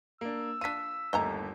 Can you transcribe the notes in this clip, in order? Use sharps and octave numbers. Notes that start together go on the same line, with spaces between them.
A#3 D4 E6
D4 F4 B6 D#7
G1 D#2 A3 D#5 G#5 A#5